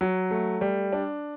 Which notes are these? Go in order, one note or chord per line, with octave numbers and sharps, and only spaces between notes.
F#3
A3
G3
D4